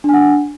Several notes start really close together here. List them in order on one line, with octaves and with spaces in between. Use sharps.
D4 G#5 F#5